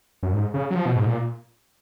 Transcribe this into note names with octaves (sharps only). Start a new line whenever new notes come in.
F#2
G#2
C#3
F#3
F3
B2
G#2
A#2